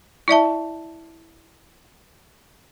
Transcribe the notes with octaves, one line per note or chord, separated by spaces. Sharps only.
E4 D5 E5 A5